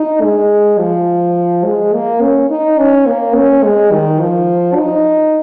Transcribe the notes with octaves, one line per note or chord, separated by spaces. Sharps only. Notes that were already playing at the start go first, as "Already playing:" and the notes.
Already playing: D#4
G#3
F3
G#3
A#3
C#4
D#4
C#4
A#3
C#4
G#3
D#3
F3
D#4